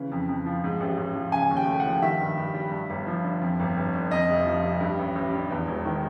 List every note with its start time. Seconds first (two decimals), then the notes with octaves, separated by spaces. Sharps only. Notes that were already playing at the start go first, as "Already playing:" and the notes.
Already playing: C#3 E3
0.12 F2
0.29 F2
0.46 F3
0.64 G#2
0.80 A1
0.98 A1
1.15 F3
1.32 C#3 G#5
1.51 D#2
1.57 G5
1.67 A3
1.80 F#5
1.86 F3
2.02 D#3 E5
2.20 G2
2.37 G2
2.54 G3
2.72 G2
2.90 G1
3.07 F3
3.24 D3
3.42 F2
3.60 G1
3.77 G1
3.93 D3
4.11 F2 D#5
4.29 F1
4.46 F3
4.63 C3
4.81 G2
4.99 A1
5.16 A1
5.33 D3
5.51 E2
5.67 E1
5.85 D#3